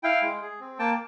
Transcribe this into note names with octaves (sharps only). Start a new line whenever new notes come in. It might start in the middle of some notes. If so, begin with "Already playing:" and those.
E4 F5 G5
G#3
G#4
C4
A#3 G5 A5